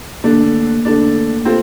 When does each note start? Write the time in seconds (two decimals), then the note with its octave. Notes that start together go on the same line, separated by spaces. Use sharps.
0.24 D3 A3 A#3 D4
0.85 D3 A3 D4
1.45 A3 C4 F4